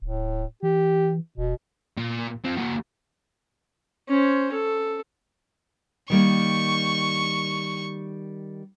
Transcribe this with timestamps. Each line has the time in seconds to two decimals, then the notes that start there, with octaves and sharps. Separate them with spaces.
0.02 D1 A2
0.63 E3 G4
1.38 E1 B2
1.97 A#2
2.44 F3 C4
2.57 A#3 F#4
4.09 C#4 C5
4.53 A4
6.10 D#3 G3 A#3 C#6